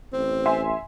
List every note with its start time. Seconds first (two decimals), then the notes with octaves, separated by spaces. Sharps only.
0.13 A1 C4
0.46 E5 G#5 C6